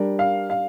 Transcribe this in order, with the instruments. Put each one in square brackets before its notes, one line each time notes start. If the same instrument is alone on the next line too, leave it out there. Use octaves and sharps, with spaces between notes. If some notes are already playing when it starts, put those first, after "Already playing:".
Already playing: [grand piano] G3 D4 A#4 D5
[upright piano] F5
F5